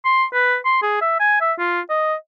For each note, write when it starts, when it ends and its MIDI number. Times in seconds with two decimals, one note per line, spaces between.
0.05 0.24 84
0.34 0.57 71
0.65 0.81 84
0.82 1.00 68
1.01 1.17 76
1.20 1.39 80
1.41 1.53 76
1.59 1.81 65
1.90 2.14 75